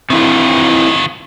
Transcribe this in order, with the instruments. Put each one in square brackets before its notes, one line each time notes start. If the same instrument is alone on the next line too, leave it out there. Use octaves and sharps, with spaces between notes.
[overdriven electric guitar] C3 E3 [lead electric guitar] D#3 F4